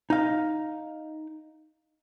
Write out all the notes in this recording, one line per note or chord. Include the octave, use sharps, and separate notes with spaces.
D#4 F5